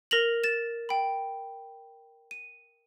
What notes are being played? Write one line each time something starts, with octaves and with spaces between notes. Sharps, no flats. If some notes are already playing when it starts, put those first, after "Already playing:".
A#4 A#6 F7 F#7
A6 E7
G5 B5
D#7